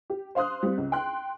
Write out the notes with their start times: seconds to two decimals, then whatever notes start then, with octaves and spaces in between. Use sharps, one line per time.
0.10 G4
0.35 C5 F5 C6 D#6 F#6
0.63 G3 C4
0.77 C#2
0.92 G5 C6 F#6